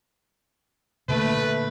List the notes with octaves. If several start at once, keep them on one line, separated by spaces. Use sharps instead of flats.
A#2 D3 A3 A#3 B4